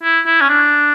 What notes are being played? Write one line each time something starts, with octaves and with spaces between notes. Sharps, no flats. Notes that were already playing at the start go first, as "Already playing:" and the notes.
E4
E4
C#4
D4